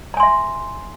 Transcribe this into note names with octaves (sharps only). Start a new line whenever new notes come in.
E5 G#5 A#5 C6